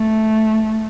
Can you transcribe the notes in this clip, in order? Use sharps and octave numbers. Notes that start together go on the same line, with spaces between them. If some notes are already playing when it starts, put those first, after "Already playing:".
Already playing: A3